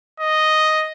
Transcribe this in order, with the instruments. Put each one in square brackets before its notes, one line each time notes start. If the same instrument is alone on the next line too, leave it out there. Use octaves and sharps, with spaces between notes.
[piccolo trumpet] D#5